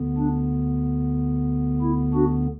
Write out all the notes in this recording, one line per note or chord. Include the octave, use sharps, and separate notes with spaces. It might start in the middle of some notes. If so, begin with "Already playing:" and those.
Already playing: D2 D3 B3
D4
E4
D4 F#4